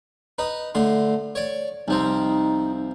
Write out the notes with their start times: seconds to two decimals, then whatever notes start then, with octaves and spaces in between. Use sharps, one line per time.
0.38 D#4 B4
0.75 A2 D3 C6
1.35 C#5 D5
1.88 C2 F3 C4 D#4